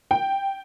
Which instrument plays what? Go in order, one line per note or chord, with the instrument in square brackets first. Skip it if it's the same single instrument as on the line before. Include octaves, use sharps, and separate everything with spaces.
[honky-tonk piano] G5